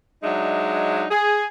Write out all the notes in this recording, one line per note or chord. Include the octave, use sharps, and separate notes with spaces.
F#3 G#3 D4 D#4 E5
G#4